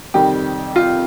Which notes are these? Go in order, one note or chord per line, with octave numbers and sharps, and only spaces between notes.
F2 C3 D#3 G3 C4 G4
F4